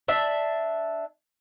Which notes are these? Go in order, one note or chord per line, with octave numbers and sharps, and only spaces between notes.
D4 E5